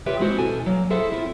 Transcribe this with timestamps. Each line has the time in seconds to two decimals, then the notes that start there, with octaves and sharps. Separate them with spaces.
0.06 F4 G4 B4 C#5 E5 G5
0.19 G#3 A#3 C4 E4 F#4 C5
0.39 B2 E3 A4 G#5
0.66 F#3 A#3
0.90 E4 G#4 A4 C5 E5 F#5
1.11 C4 E4 F4